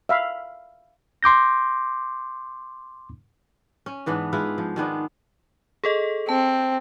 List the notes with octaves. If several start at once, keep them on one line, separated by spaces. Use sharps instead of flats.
E5 F5 B5
C6 D6 G6 A#6
C#4
G#2 E3 B3 D4
G#3 E4 F4 B4
F3
D#3 G#3 B3 D4
G#4 A4 D#5
C4 A5